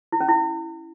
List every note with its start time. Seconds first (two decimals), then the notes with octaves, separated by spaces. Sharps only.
0.12 E4
0.20 C#4
0.28 E4